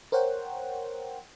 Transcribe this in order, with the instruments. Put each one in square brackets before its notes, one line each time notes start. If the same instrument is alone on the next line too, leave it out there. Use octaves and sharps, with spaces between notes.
[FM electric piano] A#4 C5 C#5 F#5 G5